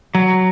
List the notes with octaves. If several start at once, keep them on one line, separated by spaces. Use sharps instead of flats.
F#3